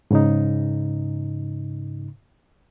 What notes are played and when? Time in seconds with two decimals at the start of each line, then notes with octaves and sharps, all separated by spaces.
0.11 G#2 C#3 D#4